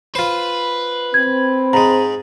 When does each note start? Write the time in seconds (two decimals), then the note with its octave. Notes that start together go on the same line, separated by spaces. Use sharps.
0.15 F4 B4 C5
1.14 C4 G#6
1.73 G#2 G#3 A#5